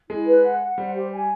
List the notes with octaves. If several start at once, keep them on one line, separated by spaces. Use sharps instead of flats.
G#3 E4
B4
F#5
F#5
G3 C5
G4
G#5